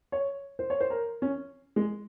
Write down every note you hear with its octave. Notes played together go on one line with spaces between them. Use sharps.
C#5
C5
C#5
C5
A#4
C#4
G#3